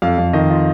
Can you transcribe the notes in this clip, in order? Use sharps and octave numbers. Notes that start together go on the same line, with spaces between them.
F2 F5
F2
D#3 D#5
F4